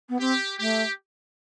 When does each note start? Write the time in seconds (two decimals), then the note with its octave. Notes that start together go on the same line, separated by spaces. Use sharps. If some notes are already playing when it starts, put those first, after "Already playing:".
0.09 B3
0.20 C4 G4
0.58 A3 G4